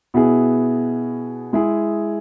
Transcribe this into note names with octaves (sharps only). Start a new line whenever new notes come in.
B2 B3 E4 G#4
G#3 E4 G#4